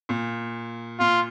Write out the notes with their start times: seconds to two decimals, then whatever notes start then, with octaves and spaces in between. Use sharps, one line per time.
0.09 A#2
0.99 A#2 F4